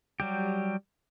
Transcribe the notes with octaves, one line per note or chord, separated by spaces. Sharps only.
F#3 G3 G4